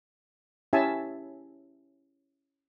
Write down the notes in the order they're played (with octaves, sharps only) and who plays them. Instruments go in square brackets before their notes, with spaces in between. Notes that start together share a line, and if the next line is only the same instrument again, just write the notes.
[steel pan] C#4 E4 G4 E5 G#5 A5